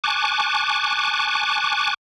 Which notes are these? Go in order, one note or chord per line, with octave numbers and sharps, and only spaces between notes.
G#5 A5 C#6 D6 F#6